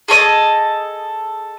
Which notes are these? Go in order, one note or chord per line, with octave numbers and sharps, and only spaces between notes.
G#4 A4 C#5 D#5